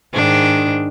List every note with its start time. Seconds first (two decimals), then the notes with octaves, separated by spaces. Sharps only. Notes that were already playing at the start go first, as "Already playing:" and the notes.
0.14 G#2 D#3 D4